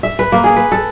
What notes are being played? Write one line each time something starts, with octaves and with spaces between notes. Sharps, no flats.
E5
B4
A#3
G#4
B4
A4